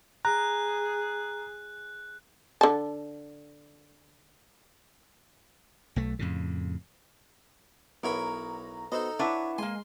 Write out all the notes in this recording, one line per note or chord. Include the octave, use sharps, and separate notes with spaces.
G#4 A#5 F#6
D3 A5
B1 A3
F2 A2 C#3
B1 B3 E4 A#4 C#5 A#5 B5
B3 D#4 F#4 A4 C5 D#5
D4 E4 B4 C#5 E5 F#5
G#3 A#3 G#5 C6